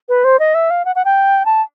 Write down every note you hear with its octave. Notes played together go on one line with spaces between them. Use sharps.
B4
C5
D#5
E5
F5
F#5
F#5
G5
A5